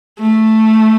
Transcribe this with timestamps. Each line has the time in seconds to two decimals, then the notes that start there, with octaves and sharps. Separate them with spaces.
0.19 A3